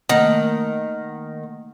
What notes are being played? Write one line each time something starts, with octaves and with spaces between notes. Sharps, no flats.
D#3 A3 A#3 D#5 F#5